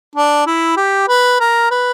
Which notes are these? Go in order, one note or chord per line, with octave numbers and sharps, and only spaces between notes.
D4
E4
G4
B4
A#4
B4